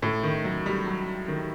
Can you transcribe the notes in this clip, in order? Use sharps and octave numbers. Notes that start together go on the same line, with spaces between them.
A2
D#3
F#3
G3
F#3
D#3